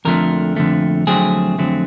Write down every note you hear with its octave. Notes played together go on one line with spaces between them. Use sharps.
F2 D3 F3 A3 A#4
F2 D3 F3 A3
F2 D3 F#3 A3 C4 G#4
F2 D3 F#3 A3 C4